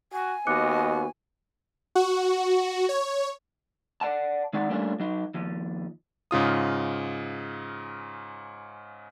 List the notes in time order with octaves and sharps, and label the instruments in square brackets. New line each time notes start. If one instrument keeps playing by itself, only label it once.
[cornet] F#4 [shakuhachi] G#5
[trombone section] D#2 B3 F#4 [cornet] D#5 [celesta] D6 F#6 C#7
[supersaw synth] F#4
C#5
[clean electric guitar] D5 F#5 A5
D#3 G#3 D#4 D5 F#5
G3 A3 A#3 C#4 D4 F4
F#3 D#4
D#2 F3
[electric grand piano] G#2 C#3 F4 D#6